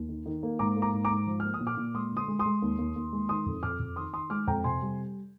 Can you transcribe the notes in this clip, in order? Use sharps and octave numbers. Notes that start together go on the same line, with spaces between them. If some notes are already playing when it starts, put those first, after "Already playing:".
Already playing: D#2
D#3
D#3
A#3
G#2 A#5 D6
A#3
A#5 D6
G#2
A#5 D6
G#2
F3
A#3 F6
D#6
A#2
D6 F6
A#2
G#3 C6 D#6
D3
C6 D#6
G#3
C6 D#6
G#3
D#2
D#2
D#2
G#3
D#3 C6 D#6
F2
F2 D6 F6
F2
D#3 C6 D#6
D#3 C6 D#6
G#3 D6 F6
F2 G5 A#5
C3 G#5 C6
G3